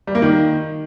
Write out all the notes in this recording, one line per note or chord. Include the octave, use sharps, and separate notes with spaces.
G3
A#3
D#3